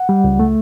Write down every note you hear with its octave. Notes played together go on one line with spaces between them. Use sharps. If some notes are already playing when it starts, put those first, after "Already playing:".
Already playing: F#5
G3
C#2
A3